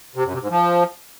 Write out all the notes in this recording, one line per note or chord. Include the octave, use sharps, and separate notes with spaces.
C3
F#2
C3
G#2
F3